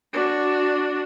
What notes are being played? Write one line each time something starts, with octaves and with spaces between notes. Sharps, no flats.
D4 F#4